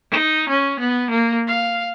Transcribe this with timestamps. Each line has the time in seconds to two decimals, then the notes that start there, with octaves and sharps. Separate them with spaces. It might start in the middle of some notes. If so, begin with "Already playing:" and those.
0.11 D#4
0.49 C#4
0.80 B3
1.11 A#3
1.48 F5